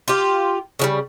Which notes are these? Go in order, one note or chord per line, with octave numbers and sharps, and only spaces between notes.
F4 G4
C#3 F3 G3